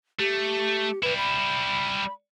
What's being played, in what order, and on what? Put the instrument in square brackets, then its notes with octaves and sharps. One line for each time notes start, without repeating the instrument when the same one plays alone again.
[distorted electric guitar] A3 [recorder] G4
[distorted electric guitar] G3 E4 [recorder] B4
[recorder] B5